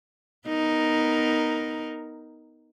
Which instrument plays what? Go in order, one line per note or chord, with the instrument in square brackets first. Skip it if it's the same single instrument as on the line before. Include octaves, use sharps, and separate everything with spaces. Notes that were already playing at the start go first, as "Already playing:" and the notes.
[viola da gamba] B3 D#4 A#4